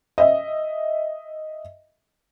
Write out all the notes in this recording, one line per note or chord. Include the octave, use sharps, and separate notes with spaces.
D#5 E5